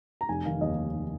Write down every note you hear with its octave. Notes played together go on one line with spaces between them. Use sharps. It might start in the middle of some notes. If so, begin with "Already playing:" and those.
A#5
F1 G#5
D#3 F5
D#2 D#5